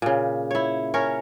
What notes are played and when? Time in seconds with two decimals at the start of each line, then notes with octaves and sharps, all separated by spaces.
0.02 A#2 C#3
0.51 E4 C#5
0.94 C#4 A#4 C#5